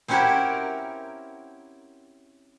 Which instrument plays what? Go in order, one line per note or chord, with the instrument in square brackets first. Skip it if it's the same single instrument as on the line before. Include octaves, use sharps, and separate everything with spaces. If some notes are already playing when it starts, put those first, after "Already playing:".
[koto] C4 C#4 E4 F#4 G4 A#4